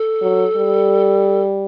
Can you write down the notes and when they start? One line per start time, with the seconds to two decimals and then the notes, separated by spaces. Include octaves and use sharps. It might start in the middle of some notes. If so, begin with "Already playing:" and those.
Already playing: A4
0.22 F#3
0.56 G3